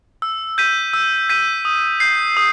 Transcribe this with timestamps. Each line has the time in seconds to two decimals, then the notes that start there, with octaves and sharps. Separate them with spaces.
0.22 E6
0.58 G6 B6 D#7
0.94 E6
1.29 G6 B6 D#7
1.65 D#6
2.00 G6 C7
2.37 D#6